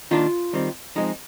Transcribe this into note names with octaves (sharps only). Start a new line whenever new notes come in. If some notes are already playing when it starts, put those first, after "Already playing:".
D#3 A#3 D4 F4
D#3 G3 C4
F3 G#3 C4 D#4